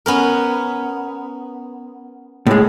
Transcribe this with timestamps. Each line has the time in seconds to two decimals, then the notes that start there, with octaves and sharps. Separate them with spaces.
0.06 B3 C#4 A#4
2.47 A2 G#3